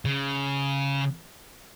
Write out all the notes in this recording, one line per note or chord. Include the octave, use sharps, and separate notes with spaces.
C#3